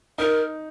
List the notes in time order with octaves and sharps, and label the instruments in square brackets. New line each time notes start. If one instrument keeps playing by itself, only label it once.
[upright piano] D#4 [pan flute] A#4